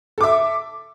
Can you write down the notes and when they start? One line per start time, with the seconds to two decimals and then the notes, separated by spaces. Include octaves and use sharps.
0.18 A4
0.21 D6
0.24 E5